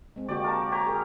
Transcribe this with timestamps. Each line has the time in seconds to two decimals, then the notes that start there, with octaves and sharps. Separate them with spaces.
0.16 G#3 C4
0.28 D3 A#3 F#4 G4 D5
0.44 A#4 A5
0.72 G4 C#5 A#5
0.87 G#4 A#4